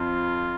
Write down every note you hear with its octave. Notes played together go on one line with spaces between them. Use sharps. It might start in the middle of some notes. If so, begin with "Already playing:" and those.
Already playing: F2 F4